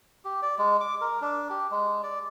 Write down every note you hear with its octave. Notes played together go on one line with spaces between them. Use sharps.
G4
D5
G#3
D6
A#4
D4
G4
G#3
D5